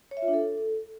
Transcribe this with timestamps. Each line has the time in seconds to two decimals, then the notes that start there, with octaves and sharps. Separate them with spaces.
0.11 C#5
0.17 E5
0.22 F4
0.28 D4
0.33 A4